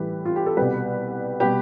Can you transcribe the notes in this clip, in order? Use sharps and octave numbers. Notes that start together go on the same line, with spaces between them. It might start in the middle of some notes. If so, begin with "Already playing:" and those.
Already playing: A2 E3 G3 G4 B4
F4
G4
A4
C2 B2 G3 G4 B4
B2 G3 G4 B4